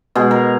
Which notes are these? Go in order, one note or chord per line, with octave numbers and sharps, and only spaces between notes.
B2 G#3 G#4
A#4